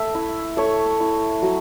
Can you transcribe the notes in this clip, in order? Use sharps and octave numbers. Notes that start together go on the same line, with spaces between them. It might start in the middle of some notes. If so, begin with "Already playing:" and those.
Already playing: A3 E5
E4
A3 C#5
E4
F#3